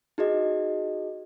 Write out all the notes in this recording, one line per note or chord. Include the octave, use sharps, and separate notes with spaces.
D#4 F#4 G#4 D#5